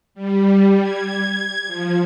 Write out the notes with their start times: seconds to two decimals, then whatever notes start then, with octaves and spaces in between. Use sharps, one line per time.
0.14 G3
0.80 G#6
1.66 F3